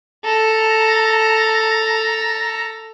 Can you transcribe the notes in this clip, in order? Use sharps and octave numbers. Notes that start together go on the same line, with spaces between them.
A4 A#5